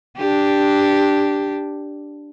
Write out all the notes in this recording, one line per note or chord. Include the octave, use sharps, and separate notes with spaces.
D4 G4